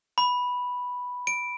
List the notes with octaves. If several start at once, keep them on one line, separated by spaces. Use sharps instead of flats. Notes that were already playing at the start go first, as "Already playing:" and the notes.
B5
D7